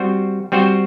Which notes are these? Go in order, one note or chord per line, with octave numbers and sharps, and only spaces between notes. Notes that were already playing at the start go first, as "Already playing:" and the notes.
Already playing: G3 C4 F#4 C5
G3 C4 F#4 C5